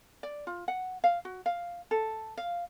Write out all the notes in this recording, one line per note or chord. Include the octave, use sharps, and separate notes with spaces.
D5
F4
F#5
F5
F#4
F5
A4
F5